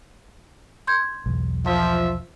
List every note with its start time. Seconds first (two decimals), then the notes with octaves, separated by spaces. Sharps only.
0.87 C6 G6 G#6
1.26 B1 E2
1.66 F3 F4 E5